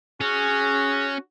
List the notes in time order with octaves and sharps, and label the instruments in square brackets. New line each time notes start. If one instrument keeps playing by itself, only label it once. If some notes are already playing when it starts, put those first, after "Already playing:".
[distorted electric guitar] C#4 [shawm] F#4 [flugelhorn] G#4